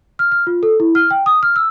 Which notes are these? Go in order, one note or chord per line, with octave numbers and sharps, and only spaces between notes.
F6
F6
F4
A4
E4
F6
G5
D#6
F6
E6